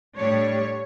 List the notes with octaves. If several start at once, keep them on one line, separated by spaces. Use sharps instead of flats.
A2 G3 D4 C#5